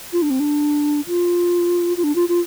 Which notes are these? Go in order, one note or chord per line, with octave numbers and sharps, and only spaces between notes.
F4
D4
C4
D4
F4
F4
D4
F4
F4